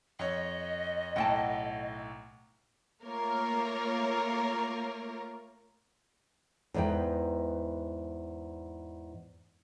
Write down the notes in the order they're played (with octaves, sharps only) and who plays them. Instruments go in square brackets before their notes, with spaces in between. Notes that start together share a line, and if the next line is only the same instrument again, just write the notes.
[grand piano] F2 C#5 [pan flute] D#5
[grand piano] B1 A2 [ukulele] F#5 G5 A5
[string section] A3 A#3 F4 A#4 C#5
[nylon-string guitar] E2 G#2 D#4 B4 G5